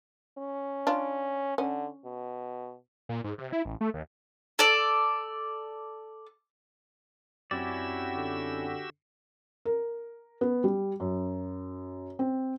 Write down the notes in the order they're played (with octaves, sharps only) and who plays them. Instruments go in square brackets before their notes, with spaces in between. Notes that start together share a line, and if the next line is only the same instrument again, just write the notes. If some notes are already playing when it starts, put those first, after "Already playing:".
[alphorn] C#4
[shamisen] D4 F4
[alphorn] D3 [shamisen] C#4
[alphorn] B2
[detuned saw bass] A#2
G#2
C3
E4
A1
A3
D#2
[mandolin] A4 D5
[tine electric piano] F#2 C4 [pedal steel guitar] C#4 E4 D5 [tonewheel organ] F#4 G4 E6
[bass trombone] D3
[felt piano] A#4
B3
G3
F#2
C4